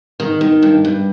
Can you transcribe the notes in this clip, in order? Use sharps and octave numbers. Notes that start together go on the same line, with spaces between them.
D#3
D#3
G2
G2